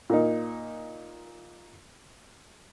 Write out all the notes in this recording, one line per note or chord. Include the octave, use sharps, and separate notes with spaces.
A#2 A#3 D#4